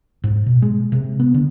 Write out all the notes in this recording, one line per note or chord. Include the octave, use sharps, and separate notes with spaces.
G#2
B2
G#3
C3
B3
D3